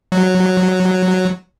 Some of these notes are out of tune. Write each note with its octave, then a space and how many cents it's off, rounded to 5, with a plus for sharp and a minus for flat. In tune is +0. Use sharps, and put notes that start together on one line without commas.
F#3 -5